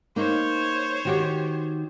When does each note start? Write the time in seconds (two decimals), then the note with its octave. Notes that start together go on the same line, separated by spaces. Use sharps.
0.16 A#3 D#4 C5 C#5
1.05 D#3 F#4 G4